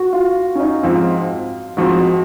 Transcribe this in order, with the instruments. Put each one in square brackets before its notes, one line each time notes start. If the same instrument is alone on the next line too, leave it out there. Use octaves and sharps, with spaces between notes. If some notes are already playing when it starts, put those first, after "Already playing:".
Already playing: [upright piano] F#4
F4
C#4
D#4
[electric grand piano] G#2 F3 C4 [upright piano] F4
[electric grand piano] G#2 F3 C4 [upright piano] F#4